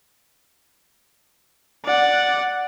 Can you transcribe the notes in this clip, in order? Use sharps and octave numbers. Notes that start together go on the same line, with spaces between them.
D5 F#5